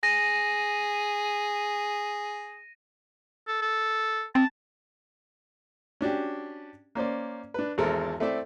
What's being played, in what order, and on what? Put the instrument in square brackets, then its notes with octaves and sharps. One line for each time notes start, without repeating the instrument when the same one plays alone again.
[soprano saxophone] G#4 [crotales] A#6 D#7
[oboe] A4
A4
[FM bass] C4 [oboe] A5
[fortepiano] C#4 D4 F#4 G4
A#3 C#4 C5 D5
D4 B4
G#1 E2 G#3 A4 A#4 C5
A3 C4 E4 D5 E5